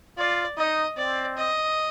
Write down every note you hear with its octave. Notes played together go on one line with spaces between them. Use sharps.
F4 D5
D#4 D#5
C4 D5
D#5